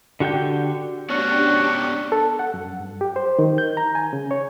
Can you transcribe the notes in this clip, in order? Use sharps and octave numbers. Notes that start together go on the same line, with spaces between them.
D3 F#4 G4 G5 G6
B3 D4 F#4 G4 C#5 D5
A4
F#5
F#2
G2
G4
C5
D#3
G6
A#5
G#5
C#3
C#5